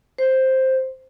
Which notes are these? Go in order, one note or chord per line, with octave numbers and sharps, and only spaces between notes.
C5